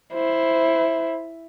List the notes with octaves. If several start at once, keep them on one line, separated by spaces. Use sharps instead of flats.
E4 C5